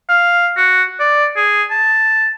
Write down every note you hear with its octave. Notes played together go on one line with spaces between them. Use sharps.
F5
F#4
D5
G#4
A5